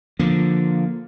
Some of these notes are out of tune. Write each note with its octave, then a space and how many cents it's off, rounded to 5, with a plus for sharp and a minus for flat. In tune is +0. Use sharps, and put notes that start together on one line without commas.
D3 +0 F3 +0 A#3 +0